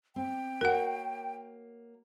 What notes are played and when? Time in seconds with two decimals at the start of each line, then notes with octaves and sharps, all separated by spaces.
0.16 C4 G5
0.61 A#3 F#4 A#4 C#5 F#5